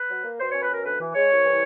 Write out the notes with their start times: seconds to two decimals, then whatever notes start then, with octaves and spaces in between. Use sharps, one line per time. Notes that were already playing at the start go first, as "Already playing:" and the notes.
Already playing: B4
0.09 F#3
0.24 A#3
0.40 B2 C5
0.51 C#4 C#5
0.61 B4
0.69 B2 A#4
0.84 D2 B4
0.99 E3
1.14 G#3 C#5
1.30 C2
1.44 E3